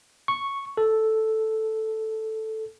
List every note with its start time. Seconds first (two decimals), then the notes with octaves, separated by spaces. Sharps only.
0.28 C#6
0.77 A4